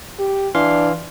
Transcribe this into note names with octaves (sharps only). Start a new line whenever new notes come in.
G4
E3 D4 F5 C6